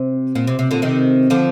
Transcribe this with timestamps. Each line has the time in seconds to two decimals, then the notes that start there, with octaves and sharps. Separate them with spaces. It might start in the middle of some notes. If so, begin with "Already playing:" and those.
Already playing: C3
0.35 A#2
0.47 C3
0.59 C3
0.71 A#2 D3
0.82 C3 D#3
1.30 D3 F3